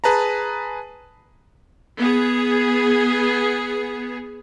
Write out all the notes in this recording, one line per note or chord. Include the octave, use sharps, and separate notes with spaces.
G#4 B4 A5 A#5
B3 G#4